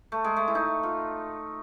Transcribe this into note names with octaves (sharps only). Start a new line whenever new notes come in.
A3
G#3
A3
E4
D#4
F4